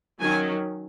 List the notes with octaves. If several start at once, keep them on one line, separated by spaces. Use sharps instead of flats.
D#3 F#3 C#4 G#5